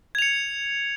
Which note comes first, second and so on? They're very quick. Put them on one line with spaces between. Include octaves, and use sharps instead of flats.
G#6 F7 C#7